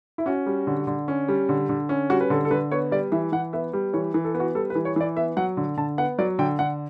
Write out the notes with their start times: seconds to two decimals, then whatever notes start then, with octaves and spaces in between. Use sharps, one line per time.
0.18 E4
0.26 C#4 F#4
0.46 G3
0.67 D3
0.87 D3
1.08 C#4
1.28 G3
1.49 D3
1.69 D3
1.89 C#4
2.10 G3 F#4
2.21 B4
2.30 D3 A4
2.45 A4
2.51 D3 B4
2.71 B3 C#5
2.91 G3 D5
3.12 E3 E5
3.32 E3 F#5
3.53 B3 E5
3.73 G3
3.93 E3 C#5
4.14 E3
4.25 A4
4.34 B3
4.40 F#4
4.55 G3 A4
4.70 B4
4.75 E3
4.85 C#5
4.96 E3 D5
5.16 B3 E5
5.37 F#3 F#5
5.57 D3
5.77 D3 A5
5.98 B3 F#5
6.19 F#3 D5
6.39 D3 G5
6.59 D3 F#5